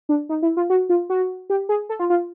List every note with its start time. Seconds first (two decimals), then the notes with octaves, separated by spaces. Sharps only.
0.09 D4
0.29 D#4
0.42 E4
0.57 F4
0.70 F#4
0.89 F4
1.10 F#4
1.50 G4
1.69 G#4
1.89 A4
1.99 F4
2.10 F4